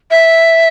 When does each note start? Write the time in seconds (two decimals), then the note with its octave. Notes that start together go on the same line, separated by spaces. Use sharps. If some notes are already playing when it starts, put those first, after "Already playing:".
0.11 E5